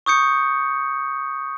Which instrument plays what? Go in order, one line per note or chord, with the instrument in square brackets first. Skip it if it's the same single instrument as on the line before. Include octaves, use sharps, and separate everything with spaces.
[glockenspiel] C#6 D#6 G6 C#7